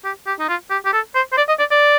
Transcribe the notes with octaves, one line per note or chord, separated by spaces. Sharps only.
G4
G4
D#4
F4
G4
G4
A4
C5
C5
D5
D#5
D5
D5